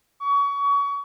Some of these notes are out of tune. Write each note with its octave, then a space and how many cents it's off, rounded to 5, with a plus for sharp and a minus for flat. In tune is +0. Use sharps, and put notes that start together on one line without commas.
C#6 +30